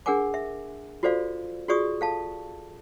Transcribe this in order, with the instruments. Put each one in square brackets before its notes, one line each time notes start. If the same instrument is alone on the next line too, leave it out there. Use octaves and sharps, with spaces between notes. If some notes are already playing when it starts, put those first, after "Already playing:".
[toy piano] D4 G#4 A#4 F#5 G#5 D6
E5
F4 F#4 A4 C5 D5 F5
F4 F#4 G#4 D5 C#6 D#6
A4 F5 A5